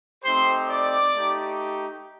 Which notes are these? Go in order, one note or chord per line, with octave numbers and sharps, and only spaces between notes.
A3 C4 D#4 G4 C5 C6
D5 D6
A3 D#4 G4